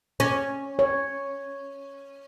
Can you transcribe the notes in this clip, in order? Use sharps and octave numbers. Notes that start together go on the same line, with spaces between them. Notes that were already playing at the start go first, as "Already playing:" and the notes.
C#4
C#5